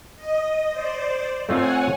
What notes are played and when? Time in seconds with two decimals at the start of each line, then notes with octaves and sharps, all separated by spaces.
0.16 D#5
0.70 C5 D5
1.49 A3 C4 F4 C#5 F#5 G#5